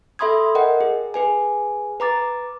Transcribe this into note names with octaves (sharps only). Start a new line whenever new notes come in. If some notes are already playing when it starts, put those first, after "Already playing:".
A4 E5 B5 C6 D#6 G#6
A#4 D#5 F#5 G5
G#4
G#4 B4 G#5
B4 A#5 D6 A6